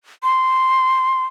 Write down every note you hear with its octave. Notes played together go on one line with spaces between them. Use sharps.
C6